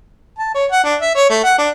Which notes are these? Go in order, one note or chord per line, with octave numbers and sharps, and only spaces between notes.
A5
C#5
F#5
D4
E5
C#5
A3
F#5
D4